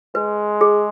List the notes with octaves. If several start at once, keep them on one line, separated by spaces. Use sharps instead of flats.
G#3 B4
G#4